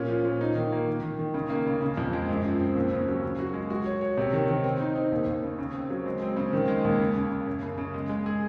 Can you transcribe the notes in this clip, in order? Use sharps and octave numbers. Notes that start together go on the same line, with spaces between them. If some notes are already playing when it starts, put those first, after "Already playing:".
Already playing: A#2 C#4
F3
A#2
D#4
D#3
A#3
D#3
D#3
D#3
C#3
A#3
C#3
C#3
F2
G#3
F#2
F3
C4
D#2
C#3
F#3
C#3
F#4
G#3
F#4
C#5
C#5
C3
D#3
D#3
C4
D#4
D#4
D#2
D#2
C#3
C#3
C4
F#3
G#3
C4
C#3
D#3
G#3
D#2
C#3
C#3
C#3
F#2
C#3
C#3
G#3
G#3
G#4